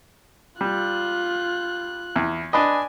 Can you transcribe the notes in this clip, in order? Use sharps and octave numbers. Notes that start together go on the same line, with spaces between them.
G3 F4 F#6
E2
D4 B4 D#5 G#5